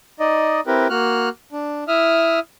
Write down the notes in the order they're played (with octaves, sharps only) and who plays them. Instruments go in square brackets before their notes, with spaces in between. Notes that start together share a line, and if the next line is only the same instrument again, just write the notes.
[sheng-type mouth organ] D#4 D5 D#5
C4 E4 G4 A#4 B4
A#3 F#4 F6 F#6
D4
E4 E5 D#6 F6